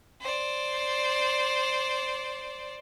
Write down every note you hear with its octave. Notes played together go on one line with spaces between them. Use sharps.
C5 D5